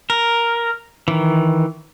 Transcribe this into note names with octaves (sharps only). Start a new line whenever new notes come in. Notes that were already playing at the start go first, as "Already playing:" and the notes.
A#4
D#3 E3